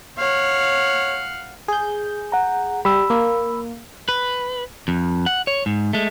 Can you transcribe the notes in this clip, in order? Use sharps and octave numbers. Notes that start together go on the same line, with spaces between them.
C#5 F5 F#5
G#4 G6
F#5 A#5
G3 B5 E6
A#3
B4
F2
F#5
C#5
G#2
G#3 A3